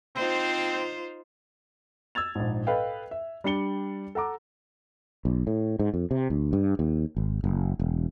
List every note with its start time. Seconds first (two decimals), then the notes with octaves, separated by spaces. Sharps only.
0.16 C4 D#4 F4 C5
2.15 E6 G#6 A6 F7
2.35 A#1 G#2
2.67 A4 B4 D#5 F5 G5
3.11 E5
3.44 G3 D4 G5 C#7 G7
4.15 A4 F#5 A#5 D6
5.25 B1
5.47 A2
5.79 G#2
5.94 F2
6.11 C3
6.30 D2
6.53 G2
6.79 D#2
7.17 G#1
7.44 F#1
7.79 E1